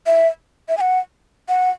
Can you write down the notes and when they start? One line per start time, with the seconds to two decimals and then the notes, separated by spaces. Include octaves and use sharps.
0.06 E5
0.69 E5
0.77 G#5
0.81 F#5
1.48 F#5